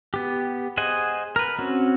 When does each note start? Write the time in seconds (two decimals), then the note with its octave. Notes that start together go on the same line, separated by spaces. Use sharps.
0.14 B3 G4
0.77 G#4 C5 D#5 F#5 G#5
1.36 A#4 B4
1.59 C4 C#4 F#4